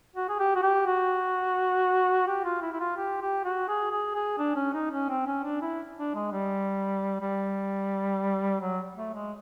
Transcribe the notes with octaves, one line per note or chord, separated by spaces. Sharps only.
F#4
G#4
G4
F#4
G4
F#4
G4
F4
E4
E4
F4
G4
G4
F#4
G#4
G#4
G#4
D4
C#4
D#4
C#4
C4
C#4
D4
E4
D4
G#3
G3
G3
F#3
A3
G#3